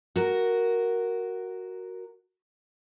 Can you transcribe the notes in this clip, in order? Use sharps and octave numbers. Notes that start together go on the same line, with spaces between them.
F#4 A#4